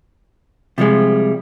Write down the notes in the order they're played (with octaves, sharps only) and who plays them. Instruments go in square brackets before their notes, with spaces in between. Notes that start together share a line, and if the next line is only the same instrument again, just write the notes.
[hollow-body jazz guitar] C3 F3 G3 G#3